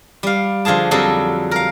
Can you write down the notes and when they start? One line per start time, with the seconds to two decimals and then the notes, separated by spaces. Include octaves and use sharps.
0.23 G3 F5
0.65 D3 F3 F4 G#4 A5
0.91 F2 F#3 G3 G#4 A4
1.51 A#4 F5